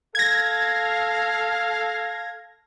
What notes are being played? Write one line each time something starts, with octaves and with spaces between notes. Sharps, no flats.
A4 F5 G#6 A#6